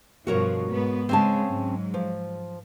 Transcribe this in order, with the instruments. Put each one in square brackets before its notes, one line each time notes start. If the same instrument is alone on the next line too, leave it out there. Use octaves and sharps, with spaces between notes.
[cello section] G2 B2 F3 [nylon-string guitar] F#4 A#4 C#5
[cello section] G#2 B3
[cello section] C#3 G#3 [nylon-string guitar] C4 C#4 A5
[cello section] G#2 F#3
[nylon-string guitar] F3